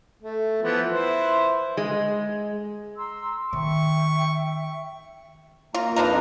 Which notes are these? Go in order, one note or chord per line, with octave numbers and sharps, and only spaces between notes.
A3
E3 F3 B3
E4 B4 C5
G#3
A#5 C6 E6
D#3 E5 G5 C#6
A#3 F4 A#5
F2 D4 D#4 F4 A#4 B4